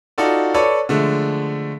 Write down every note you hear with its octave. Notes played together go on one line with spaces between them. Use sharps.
D#4 F4 F#4 A4 D5
A4 B4 C#5 D5
D3 F3 G#3 A3